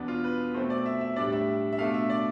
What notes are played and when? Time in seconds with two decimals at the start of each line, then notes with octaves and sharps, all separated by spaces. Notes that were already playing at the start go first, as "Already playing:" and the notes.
Already playing: E2 B2 B3 D4
0.08 F4
0.24 B4
0.54 B2 A3 C4 C5
0.70 D5
0.86 E5
1.01 E5
1.16 A2 G3 D4 D5
1.32 E5
1.73 E5
1.78 B2 A3 D4 F5
1.94 E5
2.10 D5